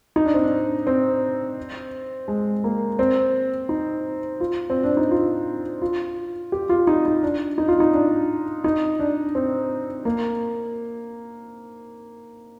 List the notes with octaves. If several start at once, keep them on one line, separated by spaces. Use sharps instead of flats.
D#4
D4
C4
D4
C4
G#3
A#3
C4
D#4
F4
C4
D4
D#4
F4
F4
G4
F4
D#4
D#4
D4
D#4
F4
D#4
D4
D#4
D4
C4
A#3